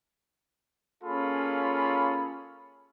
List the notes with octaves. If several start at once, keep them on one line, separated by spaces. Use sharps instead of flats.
A#3 C#4 F4 G#4 A4 B5